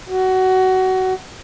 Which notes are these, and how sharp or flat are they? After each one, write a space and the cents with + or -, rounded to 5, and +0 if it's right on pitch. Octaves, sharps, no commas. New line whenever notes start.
F#4 +20